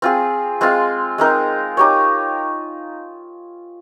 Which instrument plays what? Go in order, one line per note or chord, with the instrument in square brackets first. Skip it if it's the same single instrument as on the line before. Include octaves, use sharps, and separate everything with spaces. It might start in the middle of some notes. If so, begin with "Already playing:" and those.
[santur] C4 F4 G#4
G#3 C4 F4
G#3 C4 D#4 A#4
D#4 G4 C#5